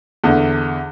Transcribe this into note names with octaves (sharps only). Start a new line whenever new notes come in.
E2 D3